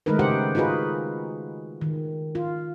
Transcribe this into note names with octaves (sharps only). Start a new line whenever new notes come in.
D#3 G#3 A3 D#4 A#4 B4
C#3 G4 C5 F#5
D#4 F4 F#4 G#4 B4
D#3
F4